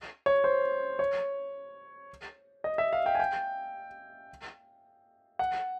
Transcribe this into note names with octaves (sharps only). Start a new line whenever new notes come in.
C#5
C5
C#5
D#5
E5
F5
G5
G#5
G5
F#5